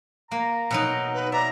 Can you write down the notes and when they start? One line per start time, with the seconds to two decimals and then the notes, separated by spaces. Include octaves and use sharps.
0.31 A#3 A#5
0.71 B2 F#3 D#4
1.14 B4
1.32 D5 E5 A#5